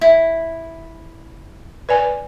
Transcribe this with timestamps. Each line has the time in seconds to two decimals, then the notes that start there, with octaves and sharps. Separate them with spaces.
0.01 E4
1.89 B4 D5 G#5